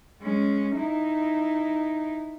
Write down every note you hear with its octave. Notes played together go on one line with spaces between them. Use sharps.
G#3 C#4
D#4 E4